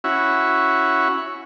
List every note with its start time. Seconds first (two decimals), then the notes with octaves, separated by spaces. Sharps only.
0.04 C#4 E4 F#4